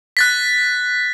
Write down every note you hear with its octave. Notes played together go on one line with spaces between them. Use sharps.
F#6 A6 B6